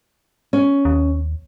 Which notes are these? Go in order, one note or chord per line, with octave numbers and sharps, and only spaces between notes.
C#4
D#2